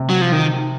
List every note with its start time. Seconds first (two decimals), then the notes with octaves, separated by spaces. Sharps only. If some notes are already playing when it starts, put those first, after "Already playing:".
Already playing: C3
0.10 F#3
0.21 F3
0.32 D#3